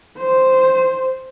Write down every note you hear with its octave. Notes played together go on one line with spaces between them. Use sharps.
C5